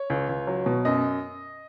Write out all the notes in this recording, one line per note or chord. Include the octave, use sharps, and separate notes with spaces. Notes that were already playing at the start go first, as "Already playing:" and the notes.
Already playing: C#5
C#2
C#2
F#3
B2
F#2 D#5